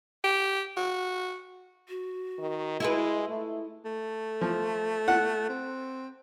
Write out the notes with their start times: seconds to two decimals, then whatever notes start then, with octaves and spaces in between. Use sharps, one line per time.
0.24 G4
0.77 F#4
1.89 F#4
2.39 D#3
2.80 G#3 E4 F4 B4
3.29 A3
3.85 A3
4.41 F3
5.08 F#5
5.49 C4